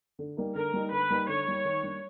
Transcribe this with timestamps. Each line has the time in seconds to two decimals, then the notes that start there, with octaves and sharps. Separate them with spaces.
0.19 D3
0.37 G3 A#3 D#4
0.55 D3 A#4
0.73 G3 A#3 D#4
0.92 D3 B4
1.10 G3 A#3 D#4
1.28 D3 C#5
1.46 G3 A#3 D#4
1.65 D#3
1.83 G3 A#3 D4